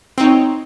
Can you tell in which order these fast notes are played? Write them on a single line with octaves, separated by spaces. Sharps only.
C4 D#4 C#5